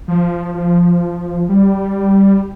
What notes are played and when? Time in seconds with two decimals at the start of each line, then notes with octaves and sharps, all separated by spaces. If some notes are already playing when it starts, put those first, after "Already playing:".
0.08 F3
0.55 F3
1.49 G3